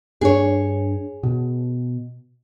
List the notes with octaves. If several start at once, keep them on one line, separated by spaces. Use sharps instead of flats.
G2 D4 G#4 C#5
B2